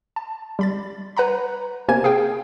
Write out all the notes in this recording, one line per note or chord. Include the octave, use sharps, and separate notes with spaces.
A5
G3 B5 A6
B4 F#5 A#5 B5
C3 A#3 A#4 C5 G#5 G#6
G#4 F5 G5